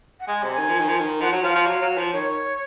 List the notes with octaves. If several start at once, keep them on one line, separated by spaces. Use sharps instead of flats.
F#5
G#3 G#5
C3
G#5
D#3
F3
D#3
F3
D#3
F3 F#5
F#3 F#5
F3 F5
F3
F#3
F#3
F3
D#3 C#5